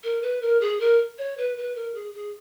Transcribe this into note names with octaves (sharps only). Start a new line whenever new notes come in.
A#4
B4
A#4
G#4
A#4
C#5
B4
B4
A#4
G#4
G#4